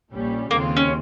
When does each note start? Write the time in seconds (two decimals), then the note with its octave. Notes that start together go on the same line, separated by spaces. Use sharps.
0.12 A#1 A#2 G3 C#4
0.51 D#2 C#3 G#3 A#3 C4 F4
0.77 C#4